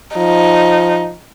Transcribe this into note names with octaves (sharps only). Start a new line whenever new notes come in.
F3 D#4